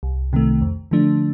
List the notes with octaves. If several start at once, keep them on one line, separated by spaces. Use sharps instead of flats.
C2
C3 D#3 A3
F2
D3 F3 A3 D4